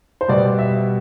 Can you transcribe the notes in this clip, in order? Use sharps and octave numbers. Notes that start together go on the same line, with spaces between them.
C5
B2 G3 B3 D5
E5